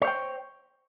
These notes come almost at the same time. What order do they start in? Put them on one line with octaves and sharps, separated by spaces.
C#5 C5 G5